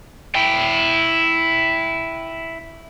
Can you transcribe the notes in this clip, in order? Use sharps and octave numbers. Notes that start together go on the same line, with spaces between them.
E4 G5